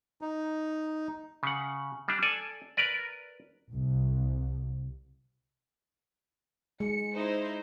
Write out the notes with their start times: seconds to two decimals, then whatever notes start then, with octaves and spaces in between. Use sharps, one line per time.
0.21 D#4
1.43 C#3 F#5
2.08 G3 D4
2.23 A4 D5 G#5
2.77 A#4 B4 D5
3.71 C2
6.80 G#3 C#7
7.16 D#4 E4 C5